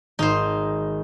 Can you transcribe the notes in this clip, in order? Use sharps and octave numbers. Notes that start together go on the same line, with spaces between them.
G#1 D#4 C5